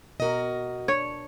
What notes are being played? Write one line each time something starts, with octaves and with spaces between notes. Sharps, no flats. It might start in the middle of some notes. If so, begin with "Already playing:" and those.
B2 F#4 A#4 D#5
D4 C#5